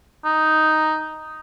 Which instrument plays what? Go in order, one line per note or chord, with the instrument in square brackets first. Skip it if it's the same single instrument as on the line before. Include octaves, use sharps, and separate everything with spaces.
[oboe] D#4